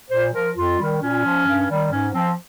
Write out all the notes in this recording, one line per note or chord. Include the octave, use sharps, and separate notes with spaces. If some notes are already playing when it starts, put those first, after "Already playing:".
A#2 C5
F3 A#4
F2 F4
D#3 G3
A#2 C#4
F3
G2
D#3 G3
G#2 C#4
F3 C4